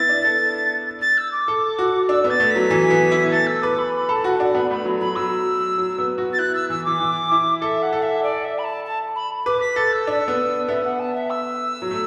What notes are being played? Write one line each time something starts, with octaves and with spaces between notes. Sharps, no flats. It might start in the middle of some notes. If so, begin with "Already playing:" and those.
Already playing: B3 E4 A6
D4
A4
A6
E6
D6
A4
F#4
D4 E6
B3
A6
A3
B6
F#3
E3
B3
E4
A4 A6
E6
B4 D6
B5
B5
A4 A5
F#4 F#5
D4 F#5
B3 B5
A3 B5
F#3
F#3 B5
F#3 E6
F#3
B3
F#4
A6
E4 F#6
E6
E3 E6
E3 D6
E3
E4
A4 E5
F#5
A4
E5
D5
E5
B5
A5
A5
B5
B4 D6
B6
A4 A6
E6
D4
B3
B3 E5
F#5
A5
E5
E6
F#3
A3